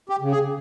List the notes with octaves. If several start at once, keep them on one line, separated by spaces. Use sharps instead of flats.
G4
C#3
G#4